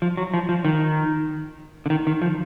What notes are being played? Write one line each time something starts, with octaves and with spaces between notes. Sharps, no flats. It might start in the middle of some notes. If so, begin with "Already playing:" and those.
F3
F#3
F3
F3
D#3
D3
D#3
D#3
F3